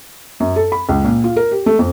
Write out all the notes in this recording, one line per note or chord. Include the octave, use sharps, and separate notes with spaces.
F#2
A4
B5
C#2
A#2
F4
A#4
G4
A3
F2